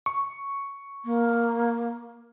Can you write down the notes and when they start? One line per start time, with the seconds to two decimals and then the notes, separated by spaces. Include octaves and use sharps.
0.06 C#6
1.04 A#3